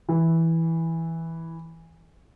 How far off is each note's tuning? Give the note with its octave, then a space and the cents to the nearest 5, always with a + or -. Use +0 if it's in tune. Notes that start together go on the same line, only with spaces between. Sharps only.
E3 -5